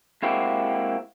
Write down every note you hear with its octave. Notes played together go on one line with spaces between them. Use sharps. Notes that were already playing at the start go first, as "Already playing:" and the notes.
G#3 A#3 C4 E4 F#4 G4